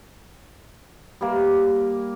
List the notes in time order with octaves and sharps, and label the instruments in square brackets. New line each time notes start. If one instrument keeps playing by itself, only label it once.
[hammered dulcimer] G3 A#3